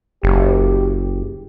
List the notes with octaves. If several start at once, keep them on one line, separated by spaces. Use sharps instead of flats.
F#1 G4